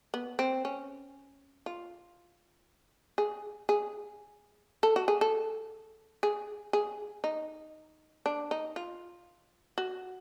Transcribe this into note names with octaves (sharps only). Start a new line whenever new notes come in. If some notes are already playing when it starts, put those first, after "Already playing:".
B3
C4
C#4
F4
G#4
G#4
A4
F#4
G#4
A4
G#4
G#4
D#4
D4
D#4
F4
F#4